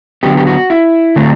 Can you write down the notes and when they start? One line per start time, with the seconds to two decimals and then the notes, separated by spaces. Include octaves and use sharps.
0.23 D3 F#3 B3 G4
0.37 G4
0.47 F#4
0.70 E4
1.16 D3 F#3 A3 C4